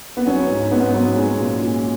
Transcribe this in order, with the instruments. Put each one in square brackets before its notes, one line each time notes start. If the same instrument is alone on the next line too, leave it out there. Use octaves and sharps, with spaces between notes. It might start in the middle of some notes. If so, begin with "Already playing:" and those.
[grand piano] B3
F#3 C#4
G#2
G#2 B3
F#3 B3
G#3 C#4
A#2
A#2